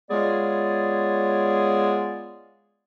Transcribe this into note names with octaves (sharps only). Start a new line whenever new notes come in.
G#3 B3 F4 G#4 C#5 D5